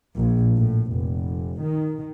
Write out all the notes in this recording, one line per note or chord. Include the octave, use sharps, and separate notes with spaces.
A#1
A2
F1
D#3